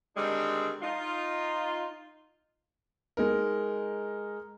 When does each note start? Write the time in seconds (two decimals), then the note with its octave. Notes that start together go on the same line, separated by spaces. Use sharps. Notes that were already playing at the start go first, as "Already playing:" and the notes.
0.17 D3 D#3 G3 G#3 C4 D4
0.83 D#4 F4
3.17 G#3 D#4 A#4